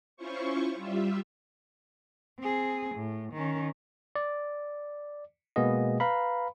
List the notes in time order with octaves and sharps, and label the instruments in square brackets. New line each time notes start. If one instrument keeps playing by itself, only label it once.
[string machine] C#4 E4 F4 C5 C#6
G3 F4 E5
[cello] C4 G#4
A2
D#3 C#4
[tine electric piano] D5
B2 G#3 A#3 B3 G#4 D#5
B4 F5 A#5 B5